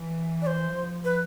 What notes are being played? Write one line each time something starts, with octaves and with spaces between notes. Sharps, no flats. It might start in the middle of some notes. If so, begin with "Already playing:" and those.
Already playing: E3
D5
C5
F3
B4